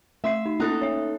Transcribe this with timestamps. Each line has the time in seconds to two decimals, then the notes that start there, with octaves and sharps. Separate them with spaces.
0.24 A3 E5 C6 C7
0.46 D#4
0.60 A#3 C#4 D#4 A4 F#6
0.81 C#5 E5